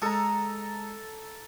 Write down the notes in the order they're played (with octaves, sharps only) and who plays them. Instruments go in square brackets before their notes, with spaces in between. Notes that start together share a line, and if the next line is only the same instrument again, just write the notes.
[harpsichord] G#3 [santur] A4 A#5